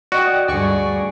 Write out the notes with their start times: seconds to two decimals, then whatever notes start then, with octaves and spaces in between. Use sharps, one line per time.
0.12 F#4 D5 D#5 G5
0.48 D2 G2 G#4 D5 C#6